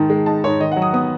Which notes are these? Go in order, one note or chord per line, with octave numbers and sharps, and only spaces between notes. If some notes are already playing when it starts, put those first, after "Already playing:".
Already playing: G#2 D#3 A5
G#3
D#4 A5
G#2 C#5
D#3 D#5
F#5
F#3
D#6
B3 D#6